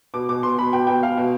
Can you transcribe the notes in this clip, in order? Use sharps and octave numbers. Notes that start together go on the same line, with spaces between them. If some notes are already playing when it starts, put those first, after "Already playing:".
B2 D6
B2 D6
B2 C6
B2 B5
B2 G5
B2 G5
B2 F5
B2